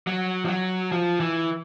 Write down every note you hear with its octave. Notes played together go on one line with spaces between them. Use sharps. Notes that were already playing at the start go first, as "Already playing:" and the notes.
F#3
F3
F#3
F3
E3